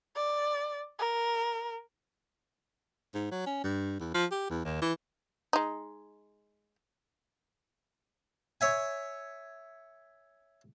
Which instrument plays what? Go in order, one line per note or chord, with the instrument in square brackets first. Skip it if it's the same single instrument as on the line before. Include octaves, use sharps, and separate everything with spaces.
[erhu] D5
A#4
[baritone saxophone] G#2
F#3
C#4
G2
E2
F3
G4
E2
D#2
E3
[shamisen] G#3 D#4
[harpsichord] C#5 E5 G#5